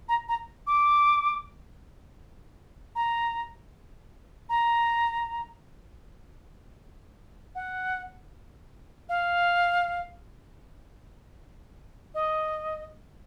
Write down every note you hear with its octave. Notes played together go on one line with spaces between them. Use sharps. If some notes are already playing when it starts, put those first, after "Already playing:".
A#5
A#5
D6
A#5
A#5
F#5
F5
D#5